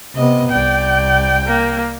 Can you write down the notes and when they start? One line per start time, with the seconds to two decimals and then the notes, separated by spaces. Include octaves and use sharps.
0.16 C3 B3 D#5
0.53 C2 D5 G5
1.46 A#3